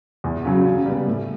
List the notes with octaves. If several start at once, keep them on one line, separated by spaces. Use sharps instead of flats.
E2
C#3 F#3
C#3
G3 B3
A2